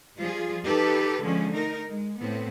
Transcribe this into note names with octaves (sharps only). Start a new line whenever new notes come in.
F3 G3 F4 G#4
D#4 G4 A4 B4
D3 F3 G#3 C#4
A3 D#4 A#4
G#3
A2 B3 C4